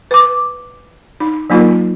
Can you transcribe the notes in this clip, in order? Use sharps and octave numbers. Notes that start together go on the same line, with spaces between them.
B4 D6
D#4
F#3 A#3 D#4 F4 A#4